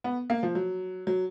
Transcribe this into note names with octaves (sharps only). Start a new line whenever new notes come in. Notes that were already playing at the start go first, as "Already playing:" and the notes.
B3
A#3
F3
F#3
F#3